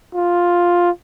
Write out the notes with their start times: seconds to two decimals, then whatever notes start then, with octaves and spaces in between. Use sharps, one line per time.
0.15 F4